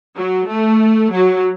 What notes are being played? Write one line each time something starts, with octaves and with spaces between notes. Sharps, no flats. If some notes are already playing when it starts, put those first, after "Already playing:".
F#3
A3
F#3